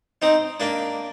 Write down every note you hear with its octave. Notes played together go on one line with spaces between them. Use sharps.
C4 D#4
A#3 D4